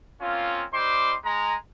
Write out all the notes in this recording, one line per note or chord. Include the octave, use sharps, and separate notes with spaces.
A#3 C4 C#4 F4
G3 D#4 C5 C6 D6
G#3 A#5